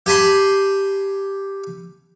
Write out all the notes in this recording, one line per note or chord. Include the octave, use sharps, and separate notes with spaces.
G4 G#5 A5 B5 C6